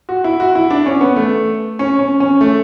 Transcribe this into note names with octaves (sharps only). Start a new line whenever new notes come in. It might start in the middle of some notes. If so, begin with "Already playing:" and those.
F#4
E4
F#4
E4
D4
C#4
B3
A3
C#4
C#4
C#4
A3